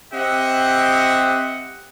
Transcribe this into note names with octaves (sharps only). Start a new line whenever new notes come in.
C4 G4 D#5 E5 F#5